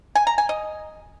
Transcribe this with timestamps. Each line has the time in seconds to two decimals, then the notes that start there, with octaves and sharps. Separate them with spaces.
0.15 G#5
0.27 A#5
0.38 G#5
0.49 D#5